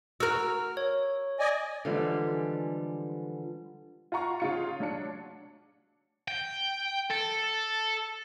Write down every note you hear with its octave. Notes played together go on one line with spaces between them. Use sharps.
F#4 A#4 E6 F6
C#5
D5 D#5 G#5
D3 E3 F3 G3 G#3
F4 F#5 A#5 C#6
C#3 F4 C#7
F#3 D4 C#7
G5
A4